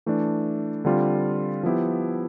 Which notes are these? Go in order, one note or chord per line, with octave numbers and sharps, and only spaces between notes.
E3 A3 D4
D3 G3 C4 F4
F3 B3 E4 G4